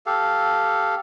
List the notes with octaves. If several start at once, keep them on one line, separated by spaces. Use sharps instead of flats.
G4 A4 F5